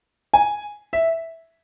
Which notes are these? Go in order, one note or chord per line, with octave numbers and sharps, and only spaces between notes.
G#5
E5